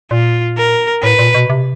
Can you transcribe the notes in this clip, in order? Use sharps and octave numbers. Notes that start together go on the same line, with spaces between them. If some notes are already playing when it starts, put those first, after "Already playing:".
A#2 F4
A#4
A2 B4
A#2
B2
C3